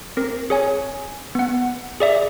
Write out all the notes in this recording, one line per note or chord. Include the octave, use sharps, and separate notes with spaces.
C4 A#4
G#4 C#5 G#5
B3 F#5
G#4 D5 E5